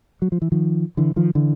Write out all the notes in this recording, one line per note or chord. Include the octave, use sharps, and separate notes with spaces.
F#3
F3
E3
D#3 F3
D3 E3
D#3 F3
D3 E3